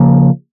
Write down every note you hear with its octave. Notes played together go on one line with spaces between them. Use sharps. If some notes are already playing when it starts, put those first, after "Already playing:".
Already playing: C#3 F3 A#3